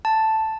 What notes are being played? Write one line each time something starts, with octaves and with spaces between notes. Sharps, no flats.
A5